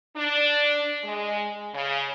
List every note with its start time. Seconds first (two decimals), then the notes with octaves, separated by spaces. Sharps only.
0.16 D4
1.03 G#3
1.74 C#3